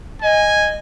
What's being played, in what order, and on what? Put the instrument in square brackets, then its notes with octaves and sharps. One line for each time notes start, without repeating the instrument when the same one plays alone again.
[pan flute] D#5 [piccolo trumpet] G#5